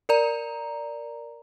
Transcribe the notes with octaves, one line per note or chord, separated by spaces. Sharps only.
A#4 D5 A#5